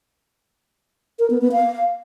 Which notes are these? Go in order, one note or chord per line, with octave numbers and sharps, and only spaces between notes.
A#4
B3
B3
F5